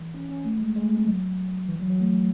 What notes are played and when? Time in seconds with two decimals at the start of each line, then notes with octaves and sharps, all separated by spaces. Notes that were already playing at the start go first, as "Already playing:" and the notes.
Already playing: E3
0.14 C#4
0.29 C#4
0.44 A3
0.60 G#3
0.76 G#3
0.86 A3
0.97 C4
1.07 F#3
1.68 E3
1.79 F#3
1.90 F#3
2.00 A3